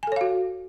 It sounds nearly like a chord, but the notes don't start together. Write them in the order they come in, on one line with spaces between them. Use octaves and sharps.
G#5 A4 C#5 F5 F#4